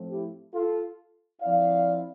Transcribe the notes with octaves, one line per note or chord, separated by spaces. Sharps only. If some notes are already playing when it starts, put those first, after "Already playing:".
Already playing: A2 F3 A3 C4
E4 G4
F4 A4
F3 C4 E4 D5 F5